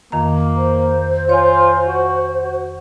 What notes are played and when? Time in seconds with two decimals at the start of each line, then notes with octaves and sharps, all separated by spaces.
0.12 F2 D#3 A#3 A#5
0.56 C5
1.29 F4 C#5 G#5
1.86 F#4
2.43 F#4